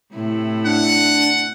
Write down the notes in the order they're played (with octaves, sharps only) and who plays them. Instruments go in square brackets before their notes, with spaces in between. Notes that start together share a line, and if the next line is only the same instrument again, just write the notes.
[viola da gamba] A2 C3 E4
[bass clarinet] D4 [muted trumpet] F#5